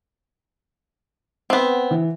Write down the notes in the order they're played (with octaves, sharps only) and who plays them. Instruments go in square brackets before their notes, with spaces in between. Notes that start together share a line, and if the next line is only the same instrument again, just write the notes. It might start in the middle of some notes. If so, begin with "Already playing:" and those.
[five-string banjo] B3 C4
[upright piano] E3